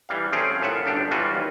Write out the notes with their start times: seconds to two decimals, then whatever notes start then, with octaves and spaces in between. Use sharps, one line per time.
0.09 E3 G3 F5
0.32 A3 C4 C#4 G#4 F5 G5
0.60 F#2 A2 F4 E5 F#5
0.85 G1 D4 G4 A4
1.11 E3 G3 F4 F#4
1.35 D#2